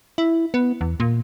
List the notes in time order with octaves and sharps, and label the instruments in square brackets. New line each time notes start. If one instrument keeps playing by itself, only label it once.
[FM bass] E4
B3
E2
A#2